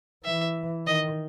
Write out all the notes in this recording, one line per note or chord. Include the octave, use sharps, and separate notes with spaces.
E3 E5
D#3 D#5